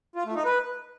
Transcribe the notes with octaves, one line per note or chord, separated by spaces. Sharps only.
F4
A3
D#4
B4